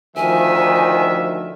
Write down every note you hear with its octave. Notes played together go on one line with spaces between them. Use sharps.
D2 D#3 F3 E5 G#5